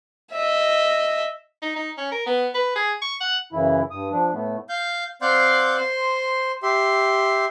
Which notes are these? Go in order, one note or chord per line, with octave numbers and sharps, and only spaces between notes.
D#5 E5
D#4
D#4
C#4
A#4
B3
B4
G#4
C#6
F#5
F#2 C#3 E3 E4
G2 D#6
F3 D4
A2 A3 B3
F5 G6
C4 D5 F5 F#5 C6 G6
C5 C6
G4 E5 C6